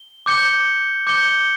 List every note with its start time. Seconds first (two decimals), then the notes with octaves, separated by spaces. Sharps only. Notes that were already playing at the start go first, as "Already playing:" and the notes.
Already playing: G7
0.26 D6 G6 C#7 G7
1.07 D6 G6 C#7 G7